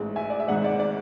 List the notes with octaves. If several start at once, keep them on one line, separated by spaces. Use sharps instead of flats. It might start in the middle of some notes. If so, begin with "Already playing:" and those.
Already playing: A1 G#2 G#3
E5 G#5
D5
E5
G#1 G#2 G#3 D5 F#5
D5
D5